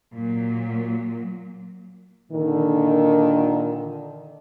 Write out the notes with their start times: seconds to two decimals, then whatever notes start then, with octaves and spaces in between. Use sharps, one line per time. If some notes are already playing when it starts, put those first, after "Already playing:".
0.14 A#2 F#3
2.31 A#2 D3 D#3